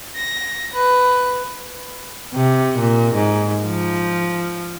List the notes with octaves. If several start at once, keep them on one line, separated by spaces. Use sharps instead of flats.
A#6
B4
C3
A#2
G#2
F3